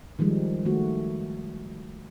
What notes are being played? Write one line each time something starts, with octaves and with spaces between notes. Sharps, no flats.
D#3 F3 G3 G#3
D#3 G#3 A3 F#4